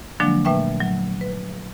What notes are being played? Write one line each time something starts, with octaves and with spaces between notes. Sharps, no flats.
D3 F3 F#3 G#3 A#3 D4
A#2 A3 B4 E5 G5 C#6
F#3
B4